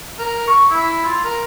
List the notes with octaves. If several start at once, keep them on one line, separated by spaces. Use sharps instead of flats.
A#4
C#6
E4
F4
A#4